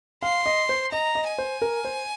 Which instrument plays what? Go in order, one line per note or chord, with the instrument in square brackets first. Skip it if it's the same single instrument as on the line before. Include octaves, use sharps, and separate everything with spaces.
[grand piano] F5 [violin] C6
[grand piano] D#5
C5
[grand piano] D#5 [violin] A#5
[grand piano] D#5
[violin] G#5
[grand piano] C5
A#4
C5